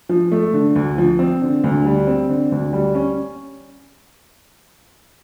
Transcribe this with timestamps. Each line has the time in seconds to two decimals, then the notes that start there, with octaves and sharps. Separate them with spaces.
0.09 F3
0.32 A3
0.54 D3
0.76 D2
0.98 F3
1.19 C4
1.42 D3
1.64 D2
1.85 G3
2.07 C4
2.29 D3
2.52 D2
2.73 G3
2.95 C#4